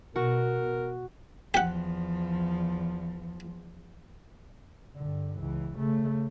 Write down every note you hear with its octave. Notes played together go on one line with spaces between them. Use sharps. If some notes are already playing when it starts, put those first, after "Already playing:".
B2 F#4 A#4
E2 F3 G4 F#5
G2 D3
C#2 E3
C#3 A3